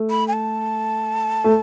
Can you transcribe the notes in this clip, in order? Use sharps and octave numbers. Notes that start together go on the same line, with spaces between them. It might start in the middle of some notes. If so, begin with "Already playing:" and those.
Already playing: A3
B5
G#5
A5
A3